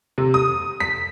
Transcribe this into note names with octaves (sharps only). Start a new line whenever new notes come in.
C3
D#6
B6